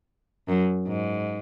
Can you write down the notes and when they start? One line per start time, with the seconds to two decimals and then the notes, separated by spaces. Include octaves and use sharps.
0.48 F#2
0.87 G#2